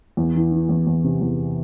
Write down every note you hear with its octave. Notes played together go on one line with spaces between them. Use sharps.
E2
E3
E3
E2
E2
C3
E2